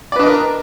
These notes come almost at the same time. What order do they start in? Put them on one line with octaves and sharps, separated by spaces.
D5 B4 D4 D#5 A#4